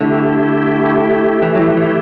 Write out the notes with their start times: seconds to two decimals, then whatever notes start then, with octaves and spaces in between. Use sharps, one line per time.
0.01 D3 A3 E4 G4
1.42 E3
1.55 F#3
1.59 E3
1.77 E3